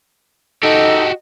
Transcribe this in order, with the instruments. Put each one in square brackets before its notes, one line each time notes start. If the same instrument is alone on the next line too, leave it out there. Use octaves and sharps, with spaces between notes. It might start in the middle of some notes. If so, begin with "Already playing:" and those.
[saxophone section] D#4 A4 [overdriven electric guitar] F#4 G4 [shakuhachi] D#5